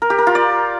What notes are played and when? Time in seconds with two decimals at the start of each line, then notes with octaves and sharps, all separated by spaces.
0.02 A#4
0.10 G4
0.18 A#4
0.27 F4
0.35 D5